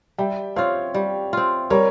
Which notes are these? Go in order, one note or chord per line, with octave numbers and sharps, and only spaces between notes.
G3 E5 G5
C4 F4 C#5 F5
G3
C4 F4
G3 A#4 C#5